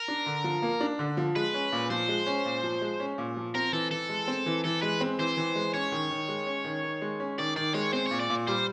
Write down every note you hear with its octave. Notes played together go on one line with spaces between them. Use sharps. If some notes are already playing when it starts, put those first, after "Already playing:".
Already playing: A#4
D4
D3
F3
A#3
D4
D3
F3
G#3 B4
C#4
A#2
F3 C5
G#3
C#4
A#2
F3
G#3
C#4
A#2
F3
C4 A#4
E3 A4
E3 A4
G#3
C4
E3
E3 A4
G#3 B4
C4
E3 C5
E3
G#3
C#4 C#5
D#3
D#3
G#3
C#4
D#3
D#3
G#3
C#4
D#3 D5
D#3 D5
G#3 C#5
C4 C5
A#2 C#5
D5
A#2
G3 C5